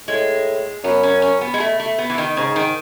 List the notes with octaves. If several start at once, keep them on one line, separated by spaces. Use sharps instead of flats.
A2 G#3
F#2 B3
C#4
C#4
B3
G#3
A3
A3
B3
E3
D#3
G#2 C#3
D#3